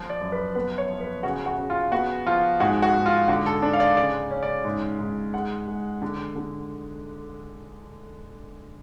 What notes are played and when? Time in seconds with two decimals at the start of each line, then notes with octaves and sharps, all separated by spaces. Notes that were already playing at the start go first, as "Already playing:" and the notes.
Already playing: F3
0.10 D5
0.21 F#2
0.32 B4
0.55 B3 B4
0.78 C#5
0.90 F3
1.00 B4
1.23 C#3 F#4
1.46 F#4
1.58 C#3
1.70 F4
1.91 B3 F#4
2.26 F3 F4
2.60 G#2 F#4
2.82 F#4
2.94 G#2
3.06 F4
3.28 D3 F#4
3.46 A4
3.62 D4 D5
3.73 F5
3.80 D5
3.97 C#3 D5
4.31 C#4
4.43 D5
4.65 G#2
4.99 G#2
5.33 G#3 F#5
5.68 G#3
6.02 D3
6.36 D3